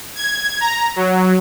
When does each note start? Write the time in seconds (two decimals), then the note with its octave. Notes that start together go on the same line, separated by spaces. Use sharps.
0.16 G#6
0.61 A#5
0.96 F#3